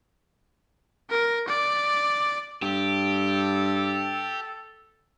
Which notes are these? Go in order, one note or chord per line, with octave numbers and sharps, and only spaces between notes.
A#4
D5
G2 G4 A4